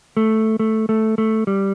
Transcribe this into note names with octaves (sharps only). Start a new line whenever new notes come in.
A3
A3
A3
A3
G3